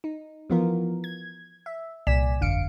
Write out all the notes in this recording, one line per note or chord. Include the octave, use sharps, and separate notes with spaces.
D#4
E3 F3 B3 F4 A#4
G#6
E5
C2 A#2 D5 G#5 B6 E7
G1 F2 D3 F5 C#7 D7